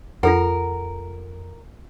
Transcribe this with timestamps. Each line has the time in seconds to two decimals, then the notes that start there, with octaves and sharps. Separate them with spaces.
0.23 F2 F4 A4 A#4 F#5